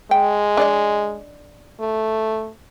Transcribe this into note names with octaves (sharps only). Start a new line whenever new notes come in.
G#3 G5
D4 D5 D#5
A3